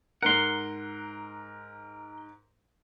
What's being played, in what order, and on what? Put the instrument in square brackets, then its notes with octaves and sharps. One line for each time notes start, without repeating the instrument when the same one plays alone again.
[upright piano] G#2 A#4 [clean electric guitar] F#5 C6